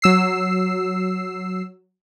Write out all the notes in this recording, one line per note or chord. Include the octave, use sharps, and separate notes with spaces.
F#3 E6 C7